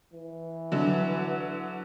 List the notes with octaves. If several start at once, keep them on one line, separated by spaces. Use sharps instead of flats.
E3
D3 F#3